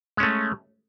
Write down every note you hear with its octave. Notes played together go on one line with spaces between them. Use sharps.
G#3 A3 C#4